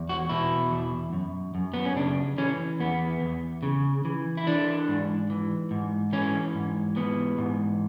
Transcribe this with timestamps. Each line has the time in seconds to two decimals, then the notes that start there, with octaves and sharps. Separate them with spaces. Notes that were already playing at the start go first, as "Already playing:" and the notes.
Already playing: E2
0.09 F#4
0.29 B2 E4
0.72 E2
1.13 F#2
1.55 F#2
1.74 B3
1.85 C#4
1.96 C#3 D4
2.38 E3 C#4
2.80 E2 B3
3.21 E2
3.63 C#3
4.05 E3
4.37 E4
4.47 E3 D4
4.88 G#2
5.30 E3
5.71 G#2
6.13 E3 C#4
6.55 G#2
6.96 E3 B3
7.38 G#2